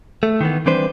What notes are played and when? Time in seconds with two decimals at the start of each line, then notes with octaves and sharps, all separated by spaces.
0.23 A3
0.41 D#3 E3 B3
0.66 E3 G3 C4 D4 B4 C5